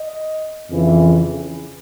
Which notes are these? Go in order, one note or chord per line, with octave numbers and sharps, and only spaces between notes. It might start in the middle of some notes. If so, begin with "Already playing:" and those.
Already playing: D#5
F2 C#3 E3